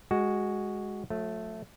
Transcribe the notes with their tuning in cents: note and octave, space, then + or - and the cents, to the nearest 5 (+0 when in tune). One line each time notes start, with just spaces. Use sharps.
G#3 -5 F#4 +5
F#3 -45 A3 +0